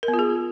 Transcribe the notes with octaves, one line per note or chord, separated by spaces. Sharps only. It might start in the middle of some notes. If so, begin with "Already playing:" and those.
A#4
B3
F4
G#4